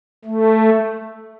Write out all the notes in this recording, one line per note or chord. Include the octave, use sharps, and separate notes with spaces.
A3